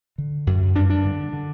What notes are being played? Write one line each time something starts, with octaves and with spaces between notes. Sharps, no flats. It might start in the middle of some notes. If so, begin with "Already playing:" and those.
D3
F#2
G2 D4
D4
D3
D3